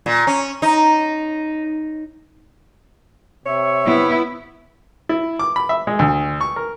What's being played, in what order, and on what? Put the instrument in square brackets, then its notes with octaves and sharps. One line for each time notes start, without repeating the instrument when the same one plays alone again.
[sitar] A#2
C#4
D#4
[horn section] C3 C#5 E5
[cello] B3 E4
[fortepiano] E4
D6
B5
E5
G#3
D2
C#6
A#4